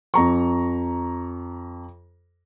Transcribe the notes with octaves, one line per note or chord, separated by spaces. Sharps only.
F2 A#5 C#6